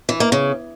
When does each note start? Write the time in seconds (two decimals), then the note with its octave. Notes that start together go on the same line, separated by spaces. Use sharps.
0.09 E3
0.20 A#3
0.32 C#3